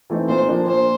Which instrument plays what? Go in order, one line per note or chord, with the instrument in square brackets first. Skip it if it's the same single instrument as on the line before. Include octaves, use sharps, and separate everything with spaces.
[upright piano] E3 A3 C4 D#4
[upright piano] A#2 [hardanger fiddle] C5
[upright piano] F3 A#3 D4
[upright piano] A#2 [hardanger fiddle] C5